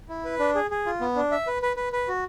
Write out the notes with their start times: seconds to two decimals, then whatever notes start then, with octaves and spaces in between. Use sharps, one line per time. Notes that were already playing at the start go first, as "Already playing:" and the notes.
0.09 E4
0.25 B4
0.39 D4
0.55 G#4
0.71 G#4
0.86 F4
1.01 B3
1.16 D4
1.31 E5
1.47 B4
1.62 B4
1.77 B4
1.93 B4
2.08 F#4